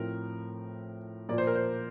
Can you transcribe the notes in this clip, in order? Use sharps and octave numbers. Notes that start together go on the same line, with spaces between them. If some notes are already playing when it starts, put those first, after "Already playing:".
Already playing: A2 F3 A3 C4 A#4
A#2 F3 A#3 D5
C5
A#4
C5